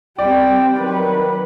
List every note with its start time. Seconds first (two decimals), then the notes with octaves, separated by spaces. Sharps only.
0.19 G3 C4 D5 G5
0.77 D#3 F#3 B4